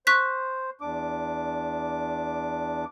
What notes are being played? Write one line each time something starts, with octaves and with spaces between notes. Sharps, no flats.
C5 C#6 F#6 B6
E2 D4 D6